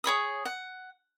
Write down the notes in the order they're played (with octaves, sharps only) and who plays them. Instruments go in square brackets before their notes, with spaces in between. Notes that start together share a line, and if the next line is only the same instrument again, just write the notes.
[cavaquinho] G#4 C#5 B5 D#6
F#5